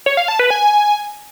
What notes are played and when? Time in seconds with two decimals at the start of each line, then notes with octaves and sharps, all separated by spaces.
0.06 C#5
0.17 F5
0.28 A5
0.39 B4
0.50 G#5